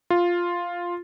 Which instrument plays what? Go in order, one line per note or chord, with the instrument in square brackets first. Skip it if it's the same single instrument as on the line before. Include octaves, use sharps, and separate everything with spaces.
[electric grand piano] F4